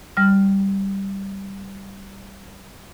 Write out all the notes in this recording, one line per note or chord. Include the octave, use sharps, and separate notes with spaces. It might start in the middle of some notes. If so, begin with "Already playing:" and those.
G3 F6